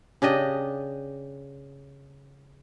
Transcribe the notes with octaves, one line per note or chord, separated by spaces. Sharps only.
C#3 D4 G4 D#5